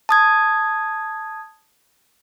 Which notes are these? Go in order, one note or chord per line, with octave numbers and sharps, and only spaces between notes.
A5 D#6 G#6